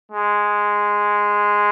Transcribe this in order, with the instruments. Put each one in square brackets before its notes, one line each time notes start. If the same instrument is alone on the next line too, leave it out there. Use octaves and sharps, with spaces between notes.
[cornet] G#3